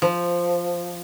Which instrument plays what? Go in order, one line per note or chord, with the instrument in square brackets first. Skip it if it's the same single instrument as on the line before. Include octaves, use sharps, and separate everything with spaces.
[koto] F3